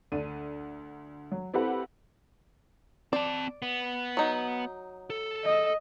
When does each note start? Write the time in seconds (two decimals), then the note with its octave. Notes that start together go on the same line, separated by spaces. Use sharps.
0.12 D2 D4 D#7
1.31 F#3
1.54 C4 E4 G4 A4 B4 F#5
3.13 C4 D5 A5
3.62 B3
4.17 F#3 D#4
5.10 A4
5.45 D#5